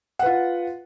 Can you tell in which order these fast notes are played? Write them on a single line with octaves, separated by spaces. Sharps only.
F#5 B4 F4